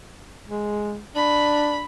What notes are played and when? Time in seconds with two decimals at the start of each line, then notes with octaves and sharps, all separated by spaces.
0.48 G#3
1.15 D4 B5